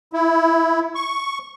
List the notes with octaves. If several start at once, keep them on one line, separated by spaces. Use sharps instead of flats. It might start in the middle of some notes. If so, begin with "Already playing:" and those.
E4
C#6